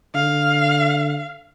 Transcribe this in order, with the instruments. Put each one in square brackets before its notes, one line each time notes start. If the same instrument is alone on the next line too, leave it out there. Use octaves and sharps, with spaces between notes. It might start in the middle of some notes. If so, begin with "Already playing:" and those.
[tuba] D3 [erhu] F5